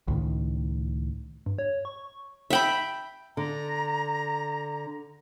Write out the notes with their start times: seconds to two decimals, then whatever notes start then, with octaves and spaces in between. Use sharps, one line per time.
0.08 C#2 A2 D#3
1.46 G2
1.59 C#5
1.85 C#6
2.50 E5 G5 B5
3.37 D3 A#5